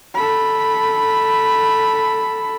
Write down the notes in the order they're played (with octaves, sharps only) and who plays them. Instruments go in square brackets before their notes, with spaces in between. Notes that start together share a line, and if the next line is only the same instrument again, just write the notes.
[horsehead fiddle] A4 B5